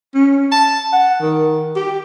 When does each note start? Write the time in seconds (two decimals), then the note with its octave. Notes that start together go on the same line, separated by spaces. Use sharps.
0.14 C#4
0.52 A5
0.93 F#5
1.21 D#3
1.76 G4